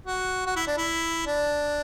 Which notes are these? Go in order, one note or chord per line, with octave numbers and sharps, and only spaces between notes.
F#4
F#4
E4
D4
E4
D4